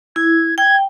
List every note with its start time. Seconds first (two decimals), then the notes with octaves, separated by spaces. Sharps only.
0.16 E4 G#6
0.58 G5 G#6